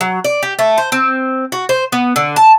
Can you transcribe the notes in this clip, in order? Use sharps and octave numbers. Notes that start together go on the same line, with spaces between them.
F#3
D5
G4
A3
C5
C4
F#4
C5
B3
D3
A5